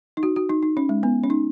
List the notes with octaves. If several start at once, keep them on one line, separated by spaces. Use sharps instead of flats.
D#4
F#4
F#4
D#4
D#4
C#4
G#3
B3
C#4
D#4